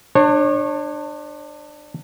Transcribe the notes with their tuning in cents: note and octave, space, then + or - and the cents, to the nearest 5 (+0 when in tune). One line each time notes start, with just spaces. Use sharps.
D4 +25 C#5 -25